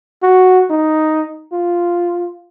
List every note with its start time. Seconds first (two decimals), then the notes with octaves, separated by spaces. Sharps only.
0.23 F#4
0.70 D#4
1.53 F4